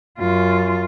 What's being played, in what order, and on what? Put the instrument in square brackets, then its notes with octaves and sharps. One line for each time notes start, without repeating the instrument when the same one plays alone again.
[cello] F#2 F4